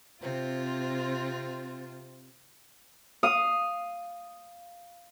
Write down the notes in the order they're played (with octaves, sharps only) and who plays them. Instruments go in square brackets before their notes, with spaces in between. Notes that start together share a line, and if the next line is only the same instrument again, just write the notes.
[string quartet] C3 C4 F4
[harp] F5 D#6